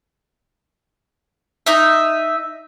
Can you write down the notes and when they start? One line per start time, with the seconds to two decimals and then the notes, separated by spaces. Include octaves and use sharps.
1.66 D#4 D#5 E5